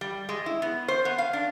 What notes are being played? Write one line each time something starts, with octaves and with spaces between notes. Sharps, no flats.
G3
G#3
E4
B3
C5
B3
F5
D4